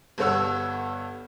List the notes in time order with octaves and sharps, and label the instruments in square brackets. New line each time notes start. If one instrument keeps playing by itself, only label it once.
[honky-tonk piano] G1 G2 A4 C#5 F#5 E6